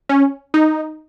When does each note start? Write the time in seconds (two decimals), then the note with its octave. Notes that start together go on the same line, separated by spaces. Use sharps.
0.09 C#4
0.54 D#4